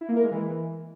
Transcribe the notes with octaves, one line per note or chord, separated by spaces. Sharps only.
E4
A#3
A#4
G#3
E3